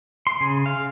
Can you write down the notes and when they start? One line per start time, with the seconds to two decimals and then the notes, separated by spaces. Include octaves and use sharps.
0.27 C6
0.41 C#3 G#4
0.66 F5